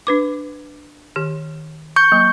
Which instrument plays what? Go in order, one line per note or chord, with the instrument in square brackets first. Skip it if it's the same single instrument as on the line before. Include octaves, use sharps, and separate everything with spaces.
[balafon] D4 B4 D6
D#3 G4
[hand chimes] C#6 G6
[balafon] F#3 A#3